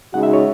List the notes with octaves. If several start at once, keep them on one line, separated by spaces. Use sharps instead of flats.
C#3 G#3 D#4 F#4 F#5
E5
C#5